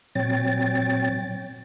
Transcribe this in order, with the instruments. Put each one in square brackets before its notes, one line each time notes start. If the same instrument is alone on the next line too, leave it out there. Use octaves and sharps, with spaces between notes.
[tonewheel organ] A#2 F#3 C4 C#5 G5 A6